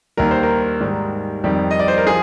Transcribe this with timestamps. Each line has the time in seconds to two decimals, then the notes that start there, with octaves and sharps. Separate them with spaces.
0.17 D#2 D#3 G3 A#4
0.31 C5
0.43 A#4
0.81 G#2 D#3 G3
1.44 F2 D#3 G3
1.71 D#5
1.80 D5
1.88 C5
1.98 A#4
2.07 F3 G#4